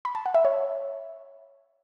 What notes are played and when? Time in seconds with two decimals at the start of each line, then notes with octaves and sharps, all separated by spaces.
0.05 B5
0.15 A5
0.26 F#5
0.34 E5
0.45 C#5